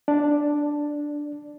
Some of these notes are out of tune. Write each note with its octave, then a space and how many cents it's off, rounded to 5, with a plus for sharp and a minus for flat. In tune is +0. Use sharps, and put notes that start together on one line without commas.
D4 +0 D5 +0